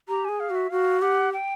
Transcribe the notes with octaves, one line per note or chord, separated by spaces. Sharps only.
G4 A#5
G#4 G#5
F5
F#4
E5
F#4 F5
G4 F#5
G5